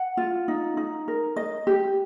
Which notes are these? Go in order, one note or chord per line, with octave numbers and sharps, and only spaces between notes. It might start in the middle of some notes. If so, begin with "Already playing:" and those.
Already playing: F#5
F4
D#4
D#4
A#4
D#5
G4